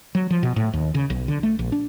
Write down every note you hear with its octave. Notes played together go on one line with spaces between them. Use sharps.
F#3
F3
B2
A2
D#2
C#3
B1
D3
A3
A#1
D4